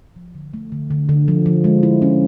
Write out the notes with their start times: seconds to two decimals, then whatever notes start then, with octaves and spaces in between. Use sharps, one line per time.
0.16 F3
0.35 D3
0.54 A3
0.72 D3
0.91 D3
1.09 D3
1.28 F3
1.46 F3
1.64 G#3
1.83 E4
2.02 C#4